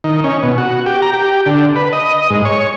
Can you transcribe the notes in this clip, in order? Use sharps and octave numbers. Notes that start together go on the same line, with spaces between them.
D#3
C#4
B2
F#4
G4
A#5
G4
D3
B4
D#5
G#2
C#5